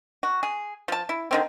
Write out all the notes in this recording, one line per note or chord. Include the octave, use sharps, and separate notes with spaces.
F#4
G#4
F3 A5
E4
D3 D#3 C4